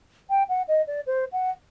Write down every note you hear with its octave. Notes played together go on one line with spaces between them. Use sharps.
G5
F#5
D#5
D5
C5
F#5